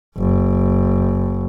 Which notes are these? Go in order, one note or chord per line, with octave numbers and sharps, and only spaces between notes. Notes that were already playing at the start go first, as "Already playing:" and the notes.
F#1